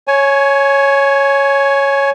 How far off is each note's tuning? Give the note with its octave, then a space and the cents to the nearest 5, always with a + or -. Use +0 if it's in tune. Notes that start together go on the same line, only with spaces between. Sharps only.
C#5 +0 G#5 +20